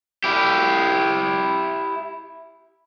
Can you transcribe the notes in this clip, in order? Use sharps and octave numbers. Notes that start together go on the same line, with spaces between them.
E4 G4